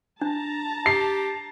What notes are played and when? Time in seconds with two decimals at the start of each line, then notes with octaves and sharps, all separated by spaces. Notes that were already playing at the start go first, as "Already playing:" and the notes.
0.21 D4 A5 A#5
0.86 G4 C7